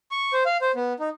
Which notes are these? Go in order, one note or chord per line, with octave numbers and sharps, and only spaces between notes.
C#6
C5
F5
C5
B3
D#4